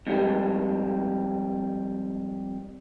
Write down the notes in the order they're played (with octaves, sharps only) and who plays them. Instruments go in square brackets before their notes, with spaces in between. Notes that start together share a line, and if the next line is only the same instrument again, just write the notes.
[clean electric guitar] F2 G#2 G3